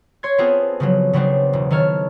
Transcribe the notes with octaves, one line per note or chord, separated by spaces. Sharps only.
C#5 C6 G#6
B3 C4 F4 G#4 A4
C#3 F3 F#3
C#3 F#3 B3 C4 D4
E1
D#3 A4 C#5 F6